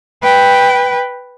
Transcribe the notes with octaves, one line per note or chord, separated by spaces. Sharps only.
B4 G5